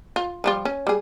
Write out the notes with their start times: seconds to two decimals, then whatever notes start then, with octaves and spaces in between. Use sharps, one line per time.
0.16 F4
0.44 F3 G3 F4
0.65 C#4
0.87 G3 G#4